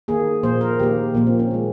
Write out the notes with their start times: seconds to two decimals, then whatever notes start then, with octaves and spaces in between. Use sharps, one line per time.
0.08 D#3 A#3 G#4
0.43 A#2 F3 A#3 C5
0.61 A#4
0.79 D#3 A#3 G4
1.14 A#2 F3 A#3
1.27 C4
1.39 C#4
1.51 D#3 G#3